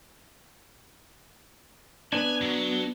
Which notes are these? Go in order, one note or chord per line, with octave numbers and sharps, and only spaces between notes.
B3 D4 G#5
F#3